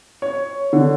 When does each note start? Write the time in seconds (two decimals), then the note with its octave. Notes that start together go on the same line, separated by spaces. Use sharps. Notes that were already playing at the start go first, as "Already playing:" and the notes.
0.22 C#5
0.73 D3